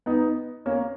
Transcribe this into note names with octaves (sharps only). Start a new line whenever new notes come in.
B3 D#4
A#3 C#4